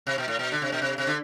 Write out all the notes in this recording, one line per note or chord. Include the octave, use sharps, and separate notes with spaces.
C3
B2
A2
B2
D3
C3
B2
C3
C3
D3